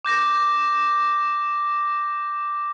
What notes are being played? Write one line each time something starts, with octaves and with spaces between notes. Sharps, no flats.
D6 G6 A#6 E7